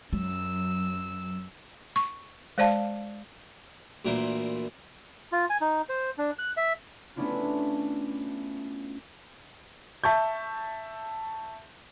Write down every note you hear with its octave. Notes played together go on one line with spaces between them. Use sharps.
F#2 F#3 E6
C#6
G#3 C5 D5 F5 A5
D2 A#2 E3 A#4 C5
F4
G#5
D#4
C5
D4
F#6
E5
A3 B3 C#4 D4 E4 F4
E5 A5 C#6 G6